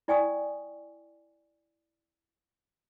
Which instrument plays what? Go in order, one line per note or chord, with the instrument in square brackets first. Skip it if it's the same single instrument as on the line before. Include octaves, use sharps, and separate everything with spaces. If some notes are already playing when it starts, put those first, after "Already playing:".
[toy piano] E4 D5 G5 G#5 C#6 D#6